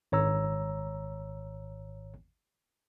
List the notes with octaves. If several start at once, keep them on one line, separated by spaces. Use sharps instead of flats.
G#1 C#5 A#5 E6